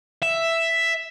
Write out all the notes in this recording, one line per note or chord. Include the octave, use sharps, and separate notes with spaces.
E5